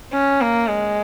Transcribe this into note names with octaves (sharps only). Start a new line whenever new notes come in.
C#4
A#3
G#3